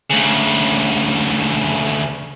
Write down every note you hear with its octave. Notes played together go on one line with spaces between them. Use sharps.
D2 C#3